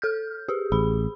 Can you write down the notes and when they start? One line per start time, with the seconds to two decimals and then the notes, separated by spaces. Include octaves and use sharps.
0.02 A4 F6 G6
0.49 G4 G#4
0.72 A1 G#4 B5